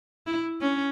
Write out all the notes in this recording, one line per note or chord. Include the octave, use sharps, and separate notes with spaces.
E4
C#4